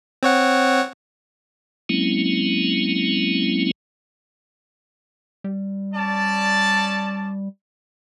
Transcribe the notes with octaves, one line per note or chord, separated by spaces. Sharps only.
C4 C#5 F#5
F#3 G#3 A#3 C4 C#4 E4
G3
C#4 D5 A5